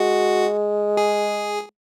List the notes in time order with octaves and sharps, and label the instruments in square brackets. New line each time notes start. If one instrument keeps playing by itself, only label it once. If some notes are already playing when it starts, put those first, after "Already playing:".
Already playing: [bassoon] G#3 [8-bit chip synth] F#4
[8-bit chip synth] G#4